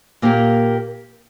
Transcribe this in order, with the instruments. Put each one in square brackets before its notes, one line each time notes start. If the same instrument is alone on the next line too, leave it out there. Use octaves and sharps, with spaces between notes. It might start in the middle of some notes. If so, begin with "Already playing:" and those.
[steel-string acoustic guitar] A#2 A#3 G4 A#4